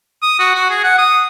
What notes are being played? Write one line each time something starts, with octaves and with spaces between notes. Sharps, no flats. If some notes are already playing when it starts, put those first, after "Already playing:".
D#6
F#4
F#4
G#4
F#5
D#6